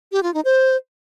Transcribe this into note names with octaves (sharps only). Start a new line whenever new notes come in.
G4
F4
D#4
C5